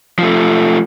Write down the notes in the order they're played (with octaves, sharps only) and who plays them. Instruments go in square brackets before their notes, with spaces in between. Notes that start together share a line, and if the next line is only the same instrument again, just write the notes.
[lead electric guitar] F3 A3